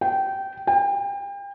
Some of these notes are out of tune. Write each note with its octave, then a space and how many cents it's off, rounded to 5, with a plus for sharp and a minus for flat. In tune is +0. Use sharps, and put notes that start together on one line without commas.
G5 -20
G5 +35